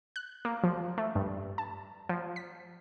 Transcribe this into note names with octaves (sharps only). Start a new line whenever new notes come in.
F#6
A#3
F3
A3
G2
A5
F3
B6